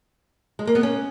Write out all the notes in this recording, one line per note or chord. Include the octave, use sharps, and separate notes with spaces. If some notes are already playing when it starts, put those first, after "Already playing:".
G#3
A#3
B3
C#4